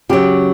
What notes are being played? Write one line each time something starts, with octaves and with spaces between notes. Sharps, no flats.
C#3 F#3 G4